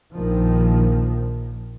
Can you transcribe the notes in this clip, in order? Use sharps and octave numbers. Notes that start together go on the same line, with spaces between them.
A#1 D#3 F3